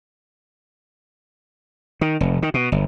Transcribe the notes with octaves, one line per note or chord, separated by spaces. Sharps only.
D#3
F1
D#3
B2
G1